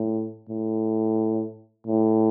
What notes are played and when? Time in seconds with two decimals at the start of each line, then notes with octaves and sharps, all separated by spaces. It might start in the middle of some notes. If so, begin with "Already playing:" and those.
Already playing: A2
0.49 A2
1.87 A2